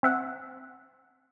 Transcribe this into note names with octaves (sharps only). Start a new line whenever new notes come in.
C4 E5 F#5